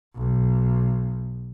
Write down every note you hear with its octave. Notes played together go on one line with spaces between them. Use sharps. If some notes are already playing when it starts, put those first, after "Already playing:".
B1